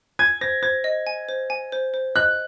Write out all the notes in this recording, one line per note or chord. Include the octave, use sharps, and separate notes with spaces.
G#5 G#6
C5 A#6
C5 G#6
D#5
G#5
C5
G#5
C5
C5
D#5 F#6